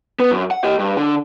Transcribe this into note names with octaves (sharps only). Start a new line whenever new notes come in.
B3
F#2
F#5
G4 D#5
G2
D3